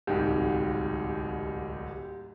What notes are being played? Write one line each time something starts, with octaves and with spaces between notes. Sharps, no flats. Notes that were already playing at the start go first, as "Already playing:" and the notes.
D1 C2 G#2 G4